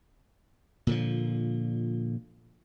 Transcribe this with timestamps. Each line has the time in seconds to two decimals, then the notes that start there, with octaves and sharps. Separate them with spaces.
0.87 A#2 D3 F3